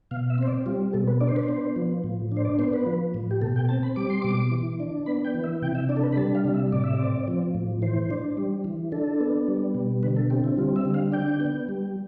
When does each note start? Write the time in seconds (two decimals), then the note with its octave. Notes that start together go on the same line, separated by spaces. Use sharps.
0.11 B2 F5
0.30 E5
0.38 C4 C5
0.47 D5
0.66 G3 F4
0.93 B2 A4
1.08 B4
1.21 D4 D5
1.29 C5
1.36 B4
1.43 C5
1.48 B3
1.76 F3
2.04 A2
2.32 D4 C5
2.45 D5
2.59 B3 C5
2.73 B4
2.86 F3
3.14 A2
3.31 G4
3.41 B2 A4
3.56 G5
3.69 C4 A5
3.83 B5
3.96 G3 D6
4.10 C6
4.22 B2 D6
4.51 E3
4.80 D4
5.06 B3 B5
5.25 G5
5.34 E3
5.44 E5
5.62 C3 G5
5.75 E5
5.89 D4 D5
5.97 A4
6.03 B4
6.12 B5
6.16 G3 A5
6.35 F5
6.45 C3
6.54 E5
6.72 A2 D5
6.84 E5
6.94 C4 D5
7.28 F3
7.55 A2
7.82 E3 C5
8.10 D4
8.37 G3
8.64 E3
8.92 D4 A4
9.20 B3
9.48 G3
9.75 B2
10.03 D3 B4
10.16 A4
10.30 C4 G4
10.44 E4
10.57 G3 F4
10.76 E5
10.85 D3
10.94 F5
11.12 D4 G5
11.40 B3
11.69 G3